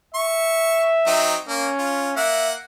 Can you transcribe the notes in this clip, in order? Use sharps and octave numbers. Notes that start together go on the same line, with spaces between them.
E5 C#6
F#3 C4 D#4
A#3 C#4
F4
A#3 E5 F#5